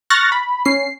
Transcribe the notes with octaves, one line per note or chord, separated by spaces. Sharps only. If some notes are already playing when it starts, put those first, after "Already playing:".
C#6 F6 F#6 A6 A#6
B5
C#4 C7